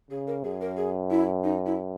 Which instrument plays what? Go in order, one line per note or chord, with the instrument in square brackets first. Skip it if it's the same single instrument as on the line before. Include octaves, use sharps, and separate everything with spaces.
[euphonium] C#3 [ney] G#4
[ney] A#4
[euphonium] F#2 [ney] G#4
[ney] A#4
G#4
E4
D#4
E4